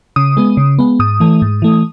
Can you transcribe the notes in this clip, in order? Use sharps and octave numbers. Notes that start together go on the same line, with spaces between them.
C#3 D#6
G#3 B3
C#3
G#3 B3
G#2 D#6
E3 A3
G#2
E3 A3